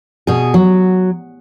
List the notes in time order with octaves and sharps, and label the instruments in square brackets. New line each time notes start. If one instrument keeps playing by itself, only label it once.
[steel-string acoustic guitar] B2 G#4
F#3